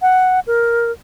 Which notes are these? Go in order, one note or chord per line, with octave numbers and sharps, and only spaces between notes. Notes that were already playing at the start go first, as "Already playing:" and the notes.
F#5
A#4